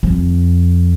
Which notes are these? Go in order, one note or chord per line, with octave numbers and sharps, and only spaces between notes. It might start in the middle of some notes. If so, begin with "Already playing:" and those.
F2